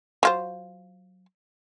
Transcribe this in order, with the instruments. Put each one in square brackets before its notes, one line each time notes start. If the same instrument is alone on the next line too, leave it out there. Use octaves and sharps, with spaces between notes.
[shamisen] F#3 F4 C5